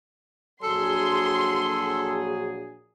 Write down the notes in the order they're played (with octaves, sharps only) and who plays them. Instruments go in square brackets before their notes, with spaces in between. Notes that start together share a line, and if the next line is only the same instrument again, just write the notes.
[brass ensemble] A#1 F#3 G#4 [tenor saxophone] A4 [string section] C6